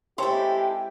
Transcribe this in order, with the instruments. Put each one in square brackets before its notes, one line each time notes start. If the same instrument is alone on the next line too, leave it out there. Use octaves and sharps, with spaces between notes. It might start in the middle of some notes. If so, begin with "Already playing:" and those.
[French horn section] G#3 C4 G4 [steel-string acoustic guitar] E4 A4 [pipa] C5 C#5 [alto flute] G5